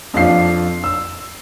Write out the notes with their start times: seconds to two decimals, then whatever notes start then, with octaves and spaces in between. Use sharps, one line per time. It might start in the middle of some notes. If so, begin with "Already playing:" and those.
0.14 F2 D4 F4 C7
0.84 E6